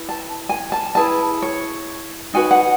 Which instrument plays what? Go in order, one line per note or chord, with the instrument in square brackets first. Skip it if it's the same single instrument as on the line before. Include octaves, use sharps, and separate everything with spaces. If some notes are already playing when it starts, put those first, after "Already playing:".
Already playing: [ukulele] E4 B4
A5
G#5
A5
E4 G#4 B4 A5
C#5
D#4 F#4 B4 G#5
F#5